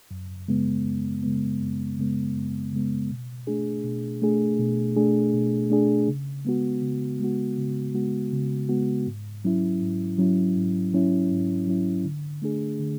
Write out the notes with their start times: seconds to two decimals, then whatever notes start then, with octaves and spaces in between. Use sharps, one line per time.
0.11 F#2
0.48 C#3 G#3 B3
0.86 F#2
1.23 C#3 G#3 B3
1.61 F#2
1.98 C#3 G#3 B3
2.35 F#2
2.73 C#3 G#3 B3
3.10 B2
3.47 A3 D4 G#4
3.84 B2
4.22 A3 D4 G#4
4.59 B2
4.96 A3 D4 G#4
5.34 B2
5.70 A3 D4 G#4
6.08 C#3
6.45 G#3 B3 F#4
6.82 C#3
7.20 G#3 B3 F#4
7.58 C#3
7.94 G#3 B3 F#4
8.32 C#3
8.69 G#3 B3 F#4
9.07 G#2
9.45 F#3 C#4 E4
9.82 G#2
10.18 F#3 C#4 E4
10.56 G#2
10.93 F#3 C#4 E4
11.31 G#2
11.67 F#3 C#4 E4
12.05 D3
12.42 A3 D4 G#4
12.79 D3